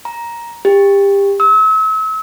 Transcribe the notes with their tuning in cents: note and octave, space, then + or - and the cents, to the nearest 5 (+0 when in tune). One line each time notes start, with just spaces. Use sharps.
A#5 +10
G4 +25
E6 -40